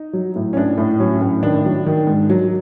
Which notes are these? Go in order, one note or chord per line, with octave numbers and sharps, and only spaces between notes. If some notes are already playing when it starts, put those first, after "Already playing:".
Already playing: D#4
F#3
A2
C#4
A2 D4
A2
F#3 C#4
A2
D#3 D4
F#3
D#3
G#2
F#3